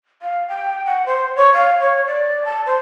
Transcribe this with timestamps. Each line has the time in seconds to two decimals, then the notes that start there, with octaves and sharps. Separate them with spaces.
0.22 F5
0.48 G5
0.86 F#5
1.06 C5
1.36 C#5
1.54 F5
1.81 C#5
2.06 D5
2.45 A5
2.66 C5